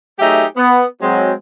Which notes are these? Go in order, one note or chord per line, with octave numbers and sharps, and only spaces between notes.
F#3 A3 D#4 G4 G#4 E5
B3
F#3 G#3 C4